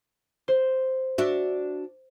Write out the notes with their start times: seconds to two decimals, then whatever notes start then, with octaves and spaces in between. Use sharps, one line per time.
0.48 C5
1.18 D4 F#4 E5